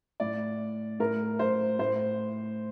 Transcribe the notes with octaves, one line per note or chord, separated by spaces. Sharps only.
A2 D5
A2 A#4
C5
A2 C5